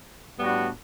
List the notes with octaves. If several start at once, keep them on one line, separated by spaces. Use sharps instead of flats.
A2 G3 B3 D4 F#4